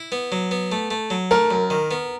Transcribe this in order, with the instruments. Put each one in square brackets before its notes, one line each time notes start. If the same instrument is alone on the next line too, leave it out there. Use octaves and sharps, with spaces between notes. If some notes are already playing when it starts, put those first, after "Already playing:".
Already playing: [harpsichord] E4
B3
F#3
B3
A3
A3
F#3
[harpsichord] A3 [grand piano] A#4
[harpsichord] F#2
D#3
B3